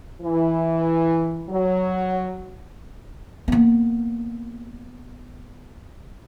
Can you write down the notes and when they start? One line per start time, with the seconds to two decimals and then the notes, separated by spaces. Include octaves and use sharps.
0.22 E3
1.50 F#3
3.48 A#3 B3